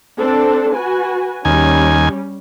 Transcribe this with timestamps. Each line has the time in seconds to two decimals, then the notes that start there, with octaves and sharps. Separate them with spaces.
0.19 C4 D4 A4
0.74 F#4 B4 G#5
1.45 D#2 G3 C#4 G#5